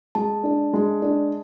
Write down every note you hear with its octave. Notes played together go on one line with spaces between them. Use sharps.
G#3 A5
D4
G#3
D4